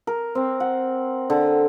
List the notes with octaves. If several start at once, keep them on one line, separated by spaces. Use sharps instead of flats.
A#4
C4
F#5
D3